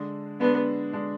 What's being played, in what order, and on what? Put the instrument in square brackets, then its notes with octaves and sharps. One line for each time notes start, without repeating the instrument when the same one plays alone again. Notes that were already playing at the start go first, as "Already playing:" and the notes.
Already playing: [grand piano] D3 G#3 D4
[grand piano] D3 G#3 D4 [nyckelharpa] B3
[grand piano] D3 G#3 D4